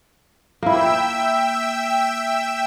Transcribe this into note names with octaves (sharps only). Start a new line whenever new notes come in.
A#3 E4 E5 G5 E6